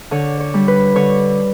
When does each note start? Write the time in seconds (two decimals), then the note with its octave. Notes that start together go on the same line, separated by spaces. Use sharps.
0.11 D3 C#5
0.40 C#5
0.54 G3
0.68 B4
0.96 D3 C#5